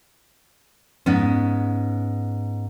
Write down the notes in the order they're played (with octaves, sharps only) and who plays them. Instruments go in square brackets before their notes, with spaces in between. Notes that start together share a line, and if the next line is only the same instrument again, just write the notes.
[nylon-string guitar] G#2 B3 C#4